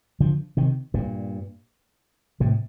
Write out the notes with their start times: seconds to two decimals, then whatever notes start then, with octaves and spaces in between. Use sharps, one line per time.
0.20 D3 F3
0.57 C3 D#3
0.94 G2 A#2
2.40 A2 C3